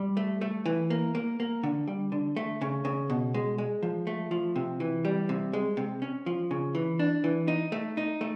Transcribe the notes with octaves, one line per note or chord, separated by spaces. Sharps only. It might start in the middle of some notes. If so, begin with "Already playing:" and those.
Already playing: G3
A3
A3
E3
A#3
A#3
A#3
D3
G3
D3
A3
C#3
C#3
B2
G#3
G#3
F3
A3
F3
C3
E3
G3
C3
G#3
C3
C#4
F3
C#3
E3
D4
E3
D#4
A3
D#4
A3